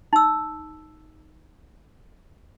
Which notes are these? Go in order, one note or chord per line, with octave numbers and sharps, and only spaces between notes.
D#4 E6